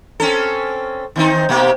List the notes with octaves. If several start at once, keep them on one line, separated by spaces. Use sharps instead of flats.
C4 C#4 A4
D#3 C4 D#4
B2 A#3 G4